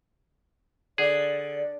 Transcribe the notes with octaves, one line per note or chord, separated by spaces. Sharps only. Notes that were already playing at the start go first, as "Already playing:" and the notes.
D3 G#4 D5